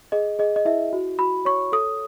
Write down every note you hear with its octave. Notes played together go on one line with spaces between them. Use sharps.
G#4 D#5
G#4 D#5
D#5
E4 E5
F#4
F#4 B5
C#5 C#6
A4 D#6